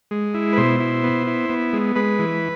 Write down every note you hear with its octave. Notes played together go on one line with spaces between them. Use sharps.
G#3
E4
B4
B2 C5
E4
B3
E4
B3
G#3
G#3 B4
E3